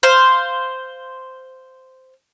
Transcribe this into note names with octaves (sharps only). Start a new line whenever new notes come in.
C5 F5